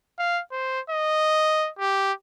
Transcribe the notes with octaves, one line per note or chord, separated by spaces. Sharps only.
F5
C5
D#5
G4